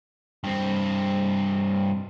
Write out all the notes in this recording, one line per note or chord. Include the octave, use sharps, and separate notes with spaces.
G2 C4